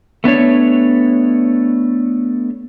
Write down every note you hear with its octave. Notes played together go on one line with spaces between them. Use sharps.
A3 B3 D4 C#5